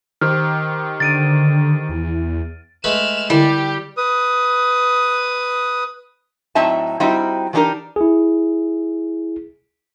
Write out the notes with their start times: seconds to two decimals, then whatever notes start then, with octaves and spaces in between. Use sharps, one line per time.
0.21 D#3 G4 C5 F6
1.00 D3 A6 D7 D#7
1.89 E2
2.84 G#3 A3 B4 F6 E7
3.30 D3 G3 E4 G4
3.97 B4 D#6
6.55 A2 F#3 C4 D#4 E5 A5
7.00 G3 C4 D#4 E4 F#4
7.53 E3 F#3 D4 D#4 G4 A#4
7.96 E4 G#4